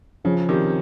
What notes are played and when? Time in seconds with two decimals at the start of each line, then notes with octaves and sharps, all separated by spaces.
0.24 C#3 F3
0.49 C3 D#3